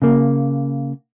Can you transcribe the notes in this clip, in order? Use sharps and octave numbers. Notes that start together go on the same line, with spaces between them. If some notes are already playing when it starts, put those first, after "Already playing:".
C#3 A#3